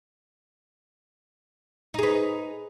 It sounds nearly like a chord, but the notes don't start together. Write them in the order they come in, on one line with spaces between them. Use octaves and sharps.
D#4 G#4 B4